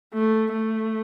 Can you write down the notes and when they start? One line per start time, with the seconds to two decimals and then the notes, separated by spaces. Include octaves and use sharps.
0.14 A3
0.52 A3